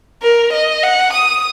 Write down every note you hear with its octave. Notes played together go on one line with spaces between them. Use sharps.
A#4
D#5
F#5
D#6